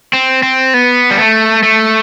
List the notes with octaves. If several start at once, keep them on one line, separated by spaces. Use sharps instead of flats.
C4
C4
B3
G3
A3
A3